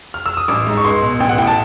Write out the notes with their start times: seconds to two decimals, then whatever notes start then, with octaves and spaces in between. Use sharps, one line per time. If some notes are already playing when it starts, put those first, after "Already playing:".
0.14 F6
0.26 E6
0.37 D#6
0.48 A1 D6
0.67 G#2
0.77 C#6
0.84 C#2 C6
1.02 B2
1.20 A1 G5
1.29 F#5
1.38 A2 G5
1.47 A5